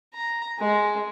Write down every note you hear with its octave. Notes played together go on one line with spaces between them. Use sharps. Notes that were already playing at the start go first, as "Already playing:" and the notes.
A#5
G#3